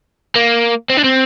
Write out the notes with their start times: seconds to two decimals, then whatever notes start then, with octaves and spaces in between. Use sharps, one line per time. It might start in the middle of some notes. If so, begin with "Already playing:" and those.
0.36 A#3
0.90 C4
0.97 D4
1.04 C4